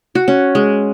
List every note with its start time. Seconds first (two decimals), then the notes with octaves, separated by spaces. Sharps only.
0.15 F#4
0.28 C#4
0.55 G#3